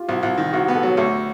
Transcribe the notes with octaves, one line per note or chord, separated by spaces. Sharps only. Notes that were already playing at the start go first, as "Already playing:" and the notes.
Already playing: F4 G4
C2 F#4
C2
D#3
C2 F#4
B3 G4
A4
F#3 C#5
D2